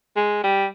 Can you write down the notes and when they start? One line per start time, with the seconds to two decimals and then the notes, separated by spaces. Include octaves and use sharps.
0.16 G#3
0.43 G3